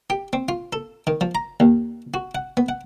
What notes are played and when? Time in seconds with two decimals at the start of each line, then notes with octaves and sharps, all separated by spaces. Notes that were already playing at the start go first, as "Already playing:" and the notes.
0.10 G4
0.33 C4
0.49 F4
0.73 A4
1.07 D#3
1.21 F3
1.35 A#5
1.60 D#2
2.14 F#4
2.35 F#5
2.57 B3
2.69 F#5